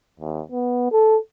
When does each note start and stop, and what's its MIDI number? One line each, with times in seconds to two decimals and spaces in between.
0.20 0.41 39
0.52 0.91 59
0.92 1.17 69